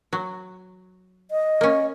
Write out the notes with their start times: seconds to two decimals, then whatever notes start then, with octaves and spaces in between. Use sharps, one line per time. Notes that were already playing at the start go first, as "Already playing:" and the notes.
0.13 F#3
1.31 D#5
1.61 A#3 C#4